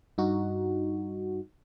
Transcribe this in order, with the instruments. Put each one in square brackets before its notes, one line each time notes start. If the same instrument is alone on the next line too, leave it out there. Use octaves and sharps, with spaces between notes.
[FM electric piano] G2 D#4 F#4